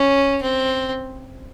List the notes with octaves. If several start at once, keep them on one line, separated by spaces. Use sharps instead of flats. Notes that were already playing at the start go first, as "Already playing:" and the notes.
Already playing: C#4
C4